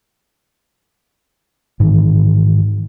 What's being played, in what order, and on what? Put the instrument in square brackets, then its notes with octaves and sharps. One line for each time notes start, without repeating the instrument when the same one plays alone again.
[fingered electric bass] G#2 D#3 E3